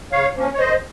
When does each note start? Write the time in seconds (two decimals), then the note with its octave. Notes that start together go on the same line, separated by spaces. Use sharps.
0.12 C#3 C#5 F5
0.35 F3 A#3 C#4
0.54 C#5
0.59 F#2 C5 D#5